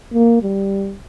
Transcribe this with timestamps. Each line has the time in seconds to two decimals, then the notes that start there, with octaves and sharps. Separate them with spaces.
0.14 A#3
0.43 G3